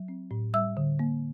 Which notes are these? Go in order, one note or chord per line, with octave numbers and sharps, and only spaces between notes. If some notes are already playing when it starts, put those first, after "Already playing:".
Already playing: F#3
C4
A2
G3 E5 E6
D3
A#3